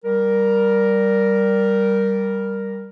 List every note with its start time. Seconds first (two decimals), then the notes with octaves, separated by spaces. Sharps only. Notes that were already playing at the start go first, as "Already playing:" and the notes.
0.04 G3 A#4